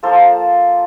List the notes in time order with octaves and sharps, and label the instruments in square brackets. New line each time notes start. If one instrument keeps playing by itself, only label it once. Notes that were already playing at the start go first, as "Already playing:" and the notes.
[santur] F3 A#3 F4 A4 C5